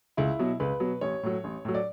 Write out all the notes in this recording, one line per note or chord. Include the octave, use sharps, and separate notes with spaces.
C#2 E4
B2 F#3
C#2 B4
B2 F#3
A1 C#5
A2 F#3
A1
A2 F#3
D5